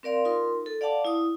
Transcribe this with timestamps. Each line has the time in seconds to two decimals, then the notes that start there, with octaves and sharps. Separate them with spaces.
0.03 C4 A#4 D5 F5 C6
0.25 D#4 F4 A#4 C6
0.66 A4
0.81 D5 F5 F#5 A5 D6
1.05 E4 D#6